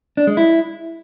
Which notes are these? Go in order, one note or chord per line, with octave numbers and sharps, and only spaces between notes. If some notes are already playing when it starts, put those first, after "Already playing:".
D4
G#3
E4